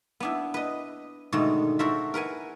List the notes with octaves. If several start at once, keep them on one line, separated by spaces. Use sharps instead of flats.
B3 D4 E4
B4 D#5
G#2 B2 D3 D#3 A3
E4 F#4 A4 A#4 C5 E5
A#4 B4 F#5 G#5